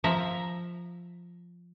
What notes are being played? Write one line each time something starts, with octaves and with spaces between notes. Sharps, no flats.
F3 E5 A#5